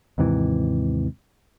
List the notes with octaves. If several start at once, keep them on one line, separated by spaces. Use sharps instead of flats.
D#2 G#2 C3 E3